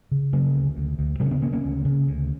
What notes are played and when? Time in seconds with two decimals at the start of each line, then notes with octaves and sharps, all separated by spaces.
0.11 C#3
0.33 C#3 F#3 A#3
0.54 D2
0.76 D2
0.99 D2
1.20 C#3 G3 B3
1.26 C#4
1.31 B3 D4
1.42 C#3 A#3 C#4
1.53 A#3 C#4
1.64 D2
1.85 C#3
2.07 D2